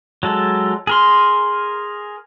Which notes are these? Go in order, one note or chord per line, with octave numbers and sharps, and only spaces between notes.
F#3 G#3 A4
G#4 A#4 C6